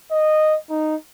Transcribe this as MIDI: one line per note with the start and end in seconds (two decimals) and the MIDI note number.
0.11 0.56 75
0.69 0.95 63